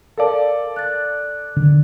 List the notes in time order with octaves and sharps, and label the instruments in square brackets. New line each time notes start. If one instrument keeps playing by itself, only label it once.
[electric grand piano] A4 D5 [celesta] A#4 F5 A5
[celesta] F#6 A6
[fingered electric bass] D3 D#3